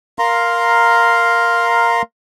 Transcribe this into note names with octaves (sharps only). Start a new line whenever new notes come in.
A#4 F5 A#5 C6